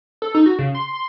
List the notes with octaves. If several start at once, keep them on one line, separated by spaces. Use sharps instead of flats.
A4
D#4
F#4
C#3
C6
C6